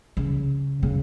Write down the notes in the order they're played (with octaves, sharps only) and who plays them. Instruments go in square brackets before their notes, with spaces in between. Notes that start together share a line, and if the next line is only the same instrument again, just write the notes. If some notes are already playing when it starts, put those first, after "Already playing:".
[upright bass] C#3
C#3